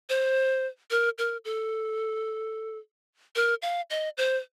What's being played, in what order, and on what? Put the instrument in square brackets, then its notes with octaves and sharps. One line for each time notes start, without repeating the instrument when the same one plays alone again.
[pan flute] C5
A#4
A#4
A4
A#4
F5
D#5
C5